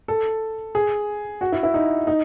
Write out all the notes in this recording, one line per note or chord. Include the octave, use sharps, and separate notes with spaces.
A4
G#4
F#4
E4
E4
D#4
D#4